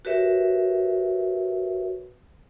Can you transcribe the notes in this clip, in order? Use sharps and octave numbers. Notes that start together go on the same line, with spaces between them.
F#4 G4 A#4 B4 C#5 E5